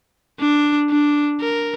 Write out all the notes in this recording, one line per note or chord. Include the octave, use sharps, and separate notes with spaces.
D4
D4
A#4